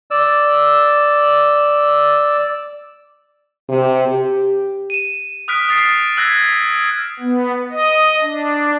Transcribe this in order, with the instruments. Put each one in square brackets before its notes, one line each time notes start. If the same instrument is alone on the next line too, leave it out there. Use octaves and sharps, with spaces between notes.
[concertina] D5 E6
[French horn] C3
G4
[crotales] D#7 E7
D#6 F6 F#6 B6 D7
D#6 A6 C7 D7
E6 F#6 G#6 A#6 B6
[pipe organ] B3
D#5
D4